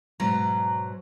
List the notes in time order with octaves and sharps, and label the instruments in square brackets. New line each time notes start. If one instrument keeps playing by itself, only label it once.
[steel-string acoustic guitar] G#2 B2 F#3 A#5